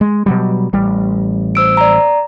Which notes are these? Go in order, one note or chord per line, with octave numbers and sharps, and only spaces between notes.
G#3
B2 F#3 G3
A1 G3
C5 E6 D7
D5 A#5